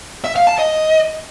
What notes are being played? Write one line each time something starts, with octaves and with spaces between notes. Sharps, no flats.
E5
F5
A5
D#5